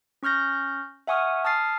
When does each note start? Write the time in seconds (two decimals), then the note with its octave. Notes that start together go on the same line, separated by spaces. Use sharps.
0.23 C#4 C#6 F6 G6 A#6
1.07 E5 F#5 G#5 C#6 D#6 F6
1.45 A5 D#6 F6 A6 C7